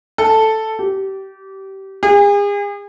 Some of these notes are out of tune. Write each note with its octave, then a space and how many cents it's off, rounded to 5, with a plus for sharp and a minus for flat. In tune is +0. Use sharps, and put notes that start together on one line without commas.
A4 +0
G4 -25
G#4 -40